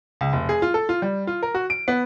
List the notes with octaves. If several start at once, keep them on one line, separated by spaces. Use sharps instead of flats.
C#2
F1
G#4
F4
A4
F4
G3
F4
A#4
F#4
D7
B3